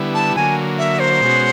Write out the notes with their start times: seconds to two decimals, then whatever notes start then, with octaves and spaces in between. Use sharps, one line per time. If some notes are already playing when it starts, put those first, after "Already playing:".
Already playing: D3 G3 B3 E4
0.14 A5
0.36 D3 F#3 A#3 G#5
0.78 E5
1.00 C5
1.21 B2 G#3 C#4 F#4